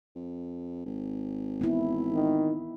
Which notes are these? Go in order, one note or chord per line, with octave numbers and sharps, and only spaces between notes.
F2
G#1
B3 E4
D#3